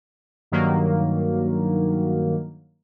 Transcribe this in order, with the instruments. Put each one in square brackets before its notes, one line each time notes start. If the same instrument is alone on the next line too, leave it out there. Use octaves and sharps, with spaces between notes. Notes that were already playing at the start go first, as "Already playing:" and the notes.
[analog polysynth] G2 D#3 F#3 A#3